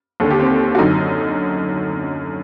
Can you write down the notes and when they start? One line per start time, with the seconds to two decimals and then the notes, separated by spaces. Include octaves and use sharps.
0.20 D#2 A4
0.24 D3
0.30 G4
0.40 C4
0.75 F#4
0.78 F#2 D3 D#4